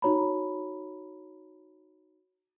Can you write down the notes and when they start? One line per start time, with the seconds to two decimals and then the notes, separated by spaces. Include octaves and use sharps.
0.02 D#4 F#4 C#5 A#5 B5